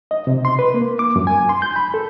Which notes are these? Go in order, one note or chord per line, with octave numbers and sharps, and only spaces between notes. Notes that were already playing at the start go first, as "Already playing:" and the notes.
D#5
C3
C6
B4
A#3
D6
F#2
G#5
C6
G6
B5
A4